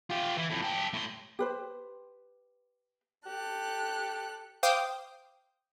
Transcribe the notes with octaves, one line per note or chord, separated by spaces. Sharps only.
F4 G4
E3 E4
F2 A2
G4 A4
A2 C6
G4 B4 C5
G4 A4 F#6
C5 F5 G5 D6 D#6 G6